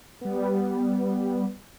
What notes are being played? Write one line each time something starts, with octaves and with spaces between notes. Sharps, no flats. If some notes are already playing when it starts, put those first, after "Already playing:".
G3 B3